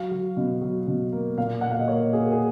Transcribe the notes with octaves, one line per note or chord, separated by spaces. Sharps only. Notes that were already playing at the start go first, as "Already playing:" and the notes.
Already playing: F#3 F5
F#3
B2
F#3
B2
A#3
A#2 F5
A#2 F#5
F5
D#5
A#3 C#5
A#3 G#4
G#4